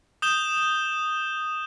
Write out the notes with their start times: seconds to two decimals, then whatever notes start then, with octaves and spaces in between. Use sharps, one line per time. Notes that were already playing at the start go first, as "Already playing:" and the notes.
0.22 D#6 G6 E7 G7